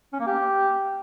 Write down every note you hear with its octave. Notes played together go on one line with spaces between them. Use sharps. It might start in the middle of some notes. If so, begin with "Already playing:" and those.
C#4
A#3
G4